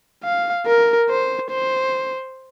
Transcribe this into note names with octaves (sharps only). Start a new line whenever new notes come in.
F5
A#4
C5
C5